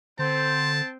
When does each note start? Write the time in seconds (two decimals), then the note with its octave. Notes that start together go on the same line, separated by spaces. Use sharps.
0.19 D3 C4 C5 A5